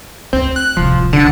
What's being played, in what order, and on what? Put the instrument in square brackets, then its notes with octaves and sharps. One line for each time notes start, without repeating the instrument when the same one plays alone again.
[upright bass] D2 [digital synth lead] C4
[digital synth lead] F#6
[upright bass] D1 C2 [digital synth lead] F3
[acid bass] D3 [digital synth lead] F#5